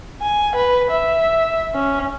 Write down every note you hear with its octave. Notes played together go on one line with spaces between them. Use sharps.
G#5
B4
E5
C#4